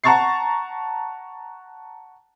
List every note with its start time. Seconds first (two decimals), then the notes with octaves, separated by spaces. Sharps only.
0.04 F#5 A5 A#5 C#6 A6 C7